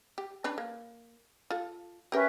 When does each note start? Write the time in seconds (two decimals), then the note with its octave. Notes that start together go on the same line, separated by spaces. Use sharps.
0.18 G4
0.44 C#4 D4 B4
0.58 A#3
1.50 F4 A4
2.12 C#4 G4 A#4 B4 E5 G5